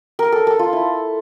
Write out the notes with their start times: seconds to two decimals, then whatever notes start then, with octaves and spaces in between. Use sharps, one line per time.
0.19 A#4
0.32 A4
0.47 A4
0.59 F4
0.73 E4